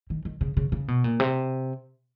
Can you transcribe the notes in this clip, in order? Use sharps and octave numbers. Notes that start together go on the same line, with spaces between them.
D#3
D#3
C#3
C#3
C#3
B2
A#2
C3